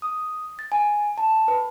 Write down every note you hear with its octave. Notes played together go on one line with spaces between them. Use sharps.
D#6
A6
G#5
A5
B4